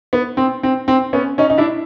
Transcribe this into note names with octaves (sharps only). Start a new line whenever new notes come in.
B3
C4
C4
C4
B3 C#4
C#4 D#4
D#4
D4 E4